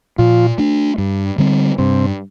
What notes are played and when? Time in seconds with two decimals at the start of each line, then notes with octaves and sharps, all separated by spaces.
0.18 A#2 F3 F4
0.58 A3 D4
0.98 G2
1.38 D3 G3 C4
1.78 G2 C3 C4